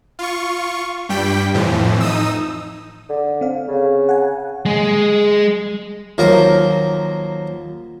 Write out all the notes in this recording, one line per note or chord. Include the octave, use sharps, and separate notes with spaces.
F4 C#6
G2 G3 G5 B6
F2 A2 E3 F3
D#4 D#6 E6
D3
C4 F5
C#3
F#5 G#5
G#3 G#4
D#2 F3 F#3 A#3 A#4 A#5